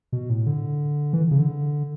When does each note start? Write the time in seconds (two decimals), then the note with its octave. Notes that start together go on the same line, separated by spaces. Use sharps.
0.13 B2
0.30 A2
0.47 D3
1.13 E3
1.31 C#3
1.39 D3